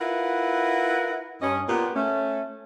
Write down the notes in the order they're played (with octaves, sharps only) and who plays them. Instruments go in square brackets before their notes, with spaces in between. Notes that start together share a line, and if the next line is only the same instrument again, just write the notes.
[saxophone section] E4 F4 A#4 B4 E5 F#5
G2 C#4 D#5
A#2 B3 G4
A3 C#4